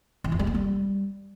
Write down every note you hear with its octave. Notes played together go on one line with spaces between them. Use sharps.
E3
F2
G3
A#3
G3